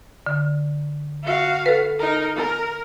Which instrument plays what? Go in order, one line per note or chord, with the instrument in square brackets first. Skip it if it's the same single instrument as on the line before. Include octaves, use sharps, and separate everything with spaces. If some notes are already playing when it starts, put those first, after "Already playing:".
[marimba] D3
[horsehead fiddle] F#4 F5
[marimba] A4 B4
[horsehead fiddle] D#4 A#4
A#4